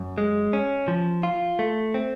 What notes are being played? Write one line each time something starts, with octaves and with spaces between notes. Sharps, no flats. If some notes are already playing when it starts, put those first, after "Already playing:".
Already playing: F#2
G#3
C#4
F3
F4
A3
C4